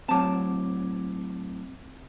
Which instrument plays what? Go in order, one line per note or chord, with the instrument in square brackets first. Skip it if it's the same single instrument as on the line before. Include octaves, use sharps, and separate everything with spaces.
[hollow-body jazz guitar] A2 F#3 A5 [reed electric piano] C4 D6